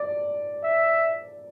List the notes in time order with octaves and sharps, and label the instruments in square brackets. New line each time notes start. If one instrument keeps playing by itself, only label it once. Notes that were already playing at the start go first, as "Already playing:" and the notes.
Already playing: [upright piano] D5
[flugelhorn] E5